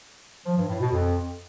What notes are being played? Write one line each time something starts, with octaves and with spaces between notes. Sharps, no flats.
F3
G2
A2
B2
F2